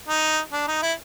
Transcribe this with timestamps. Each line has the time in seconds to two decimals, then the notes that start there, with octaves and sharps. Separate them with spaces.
0.08 D#4
0.53 D4
0.68 D#4
0.82 E4